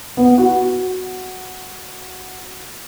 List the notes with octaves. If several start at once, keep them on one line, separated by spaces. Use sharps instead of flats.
B3
F#4